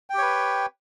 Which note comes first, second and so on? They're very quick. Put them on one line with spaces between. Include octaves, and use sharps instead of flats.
G5 G4 C#5 B4